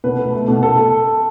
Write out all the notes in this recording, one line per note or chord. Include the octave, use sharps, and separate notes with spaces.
B2 B4
A3
A3
B2
A4